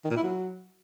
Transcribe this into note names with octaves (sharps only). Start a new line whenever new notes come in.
D#3
A#2
E4
F#3